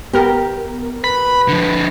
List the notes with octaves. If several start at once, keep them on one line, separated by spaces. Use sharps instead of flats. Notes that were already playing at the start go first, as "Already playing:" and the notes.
B3 G4 A#4
B4 B5
D3 F3